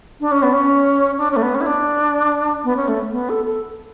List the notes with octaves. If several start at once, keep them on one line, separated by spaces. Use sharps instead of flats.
D4
C#4
B3
C#4
D4
C#4
A3
B3
C#4
E4
D4
B3
C#4
A3
B3
A4
A4